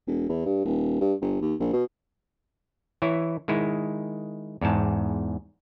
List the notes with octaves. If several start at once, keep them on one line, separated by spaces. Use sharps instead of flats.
E1
E2
G2
D#1
G2
G1
D#2
A#1
B2
E3 E4 C#5
D#3 G#3 E4
E2 G#2 A5